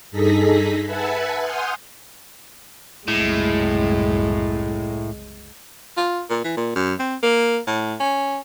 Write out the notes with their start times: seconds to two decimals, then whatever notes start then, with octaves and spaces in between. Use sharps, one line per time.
0.11 G2 D#4 G#4 A4 A#6 B6
0.86 B4 E5 F#5 G#5 A5
1.41 F#5 G#5 C6 D#6 F6 G6
3.08 F#1 C2 F#2 A2 G#3
5.97 F4
6.29 A#2
6.44 E3
6.57 A#2
6.75 F#2
6.99 C4
7.22 A#3
7.67 A2
8.00 C#4